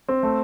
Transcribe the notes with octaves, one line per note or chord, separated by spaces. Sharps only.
C4
A3